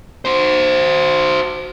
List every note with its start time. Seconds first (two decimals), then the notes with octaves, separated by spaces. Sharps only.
0.25 F#4 C5